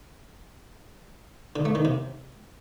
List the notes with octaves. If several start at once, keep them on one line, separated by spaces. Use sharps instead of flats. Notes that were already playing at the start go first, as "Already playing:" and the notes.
D3
A3
D#3
C3